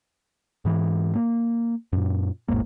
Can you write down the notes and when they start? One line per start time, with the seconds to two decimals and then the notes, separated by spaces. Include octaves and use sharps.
0.65 G#2 E3
1.15 A#3
1.93 F#2 A#2
2.48 E1 A1 G#2 A#3